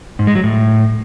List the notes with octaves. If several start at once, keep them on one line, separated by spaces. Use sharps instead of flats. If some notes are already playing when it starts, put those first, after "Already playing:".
G#2
G#3
F#3
A2